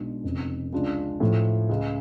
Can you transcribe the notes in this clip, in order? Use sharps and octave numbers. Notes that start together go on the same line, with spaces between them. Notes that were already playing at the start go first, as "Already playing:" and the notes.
Already playing: B1 B2 G#3 D4 G#4
F1 F2 C#3
C#2 C#3 G#3 D4 F4
A2 F3 A3
C#2 C#3 G#3